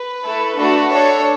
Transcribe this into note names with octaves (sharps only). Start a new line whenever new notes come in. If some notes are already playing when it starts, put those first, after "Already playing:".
Already playing: B4
A3 E4 A4
A3 D4 F#4 A4
D4 A4 C#5